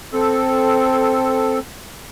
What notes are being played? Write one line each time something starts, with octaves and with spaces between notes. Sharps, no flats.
C4 A4